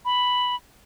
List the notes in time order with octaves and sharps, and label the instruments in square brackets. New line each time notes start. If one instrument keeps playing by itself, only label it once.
[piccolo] B5